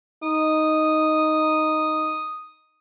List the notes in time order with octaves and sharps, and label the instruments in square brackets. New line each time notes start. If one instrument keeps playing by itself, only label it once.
[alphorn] D#4 [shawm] D#6